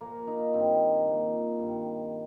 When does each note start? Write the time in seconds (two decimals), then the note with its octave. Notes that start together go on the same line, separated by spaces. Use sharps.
0.01 A#2 F3 A#3
0.27 D#4
0.54 G2 D#3 C4
1.07 A#2 F3
1.59 G2 D#3